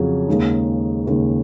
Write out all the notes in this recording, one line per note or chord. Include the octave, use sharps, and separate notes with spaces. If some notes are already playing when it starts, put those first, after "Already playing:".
Already playing: F2 C#3 F#3 C#4 G#4
D#2 C#3 G#3 D#4
D#2 C#3 G#3 D#4